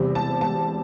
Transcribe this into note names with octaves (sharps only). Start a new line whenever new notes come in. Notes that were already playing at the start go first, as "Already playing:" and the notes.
Already playing: E2 C3 G3 C4
A5
A5